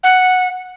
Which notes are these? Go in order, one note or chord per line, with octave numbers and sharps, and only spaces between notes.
F#5